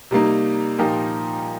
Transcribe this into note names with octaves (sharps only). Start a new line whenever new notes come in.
C3 G3 A#3 D#4
A#2 F3 D#4 G4 A#4